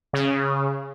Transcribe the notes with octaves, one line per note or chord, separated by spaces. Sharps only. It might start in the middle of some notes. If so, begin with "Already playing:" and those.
C#3